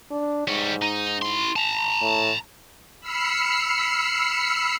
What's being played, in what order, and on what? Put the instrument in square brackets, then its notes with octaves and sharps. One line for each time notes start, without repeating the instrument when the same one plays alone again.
[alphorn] D4
[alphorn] G#2 [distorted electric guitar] G3 C#5
[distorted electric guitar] D#4
E4 C6
A5 A#5
[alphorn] A2
[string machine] B5 E6 F6 C7 C#7